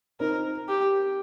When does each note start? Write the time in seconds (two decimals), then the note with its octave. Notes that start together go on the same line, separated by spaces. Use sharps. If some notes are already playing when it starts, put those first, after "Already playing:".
0.20 C4 D#4 A#4
0.69 G4